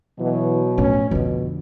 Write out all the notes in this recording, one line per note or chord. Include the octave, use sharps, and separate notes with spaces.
B2 E3 F#3
F2 A2 C#4
F2 B2 D3